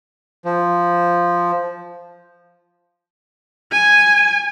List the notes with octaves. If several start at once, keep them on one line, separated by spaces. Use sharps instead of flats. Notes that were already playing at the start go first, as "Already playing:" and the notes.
F3
G#5